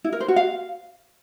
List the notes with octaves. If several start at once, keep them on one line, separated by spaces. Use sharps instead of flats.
E4
A#4
C5
F#4
F5